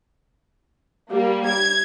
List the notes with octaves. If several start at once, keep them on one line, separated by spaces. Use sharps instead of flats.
G3 A#3
G#6